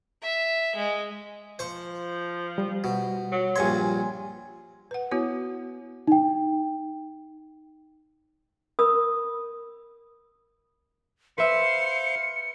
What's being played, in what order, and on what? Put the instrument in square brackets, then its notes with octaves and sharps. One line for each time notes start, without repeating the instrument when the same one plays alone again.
[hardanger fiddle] E5
G#3
[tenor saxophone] F3 [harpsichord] C5 C#6
[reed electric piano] G3
[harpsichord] B2
[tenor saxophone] F#3
[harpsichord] A#1 G2 C#5 [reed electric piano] G#5 C6
[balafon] B4 F#5
B3 E4 F#4 C#5
[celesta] D#4 G5
[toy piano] A#4 B5 D#6 E6
[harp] B4 E5 [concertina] C5 F5 C6 [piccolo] C#7